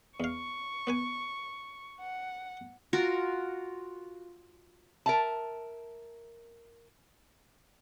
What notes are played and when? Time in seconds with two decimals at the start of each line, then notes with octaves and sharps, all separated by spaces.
0.20 E2 F5 C#6
0.87 B3 B4 G#5
2.01 F#5
2.93 F4 F#4 A#4
5.06 A#4 E5 A5